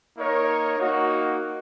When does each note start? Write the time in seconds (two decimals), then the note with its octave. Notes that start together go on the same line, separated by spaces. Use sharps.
0.18 A#3 D#4 A#4 C#5
0.78 A#3 D#4 F#4